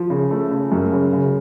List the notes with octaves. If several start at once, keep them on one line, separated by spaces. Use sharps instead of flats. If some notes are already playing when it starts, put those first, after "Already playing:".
Already playing: F3
C#3
A3
C#3
F#2
C#3
C#3